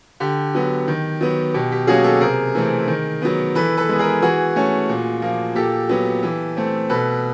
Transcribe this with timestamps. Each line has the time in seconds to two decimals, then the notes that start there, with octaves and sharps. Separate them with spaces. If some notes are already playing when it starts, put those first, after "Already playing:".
0.20 D3 G4
0.55 F#3 B3
0.88 D#3
1.21 F#3 B3
1.54 B2 G4
1.72 G4
1.87 F#3 A#3 C#4 F#4 G#4
2.04 G4 A4
2.21 C3 G#4 A#4
2.55 E3 A3 C4
2.88 D#3
3.22 F#3 B3
3.55 E3 A4 B4
3.78 A4 B4
3.89 G#3 B3
3.99 G#4 A#4
4.22 E3 F#4 G#4
4.56 A3 C#4
4.89 A#2
5.22 F3 A#3
5.55 A#2 G4 A4
5.89 F#3 B3
6.23 E3
6.57 A3 C4
6.89 B2 A4 B4